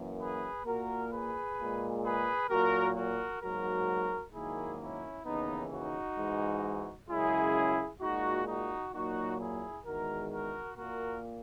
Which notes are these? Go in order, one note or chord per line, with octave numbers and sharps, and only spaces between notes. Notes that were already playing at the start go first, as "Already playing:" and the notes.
Already playing: F#2 E3 A#3
G#4 B4
A#2 A#3 F#4 A#4
G#4 B4
A#2 G#3
G#4 B4
A#2 F#3 A#3 F#4 A#4
F#4 A#4
G#2 F#3 A#3 F#4 A#4
G#2 D#3 F#3 A#3 E4 G#4
C#4 E4
D#2 C#3 E3 B3 D#4
D#4 F#4
G#2 E3 G#3
F#2 C#3 G#3 E4 G#4
A#2 G#3 D#4 F#4
D#4 F#4
A#2 F#3 A#3 D#4 F#4
E4 G#4
E2 D#3 G#3 F#4 A#4
F#4 A#4
A#2 A#3 F#4 A#4